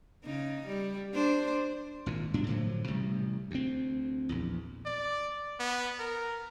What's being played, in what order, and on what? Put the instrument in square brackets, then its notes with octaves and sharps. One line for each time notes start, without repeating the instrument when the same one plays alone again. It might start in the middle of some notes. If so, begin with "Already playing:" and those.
[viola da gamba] C#3 D#4
G3
D4 C5
[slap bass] G#1 A#2
G2 B2 D4
A2 D3 F3 F#3
A1 C3 G3
D2 C4
A#1 E2
[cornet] D5
B3
A#4